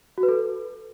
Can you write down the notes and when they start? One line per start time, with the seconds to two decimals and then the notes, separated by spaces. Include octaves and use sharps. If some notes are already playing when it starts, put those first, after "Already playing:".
0.18 F#4
0.23 B4
0.29 A4